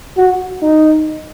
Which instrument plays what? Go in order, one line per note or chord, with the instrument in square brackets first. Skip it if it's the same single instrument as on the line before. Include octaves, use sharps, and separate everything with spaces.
[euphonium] F#4
D#4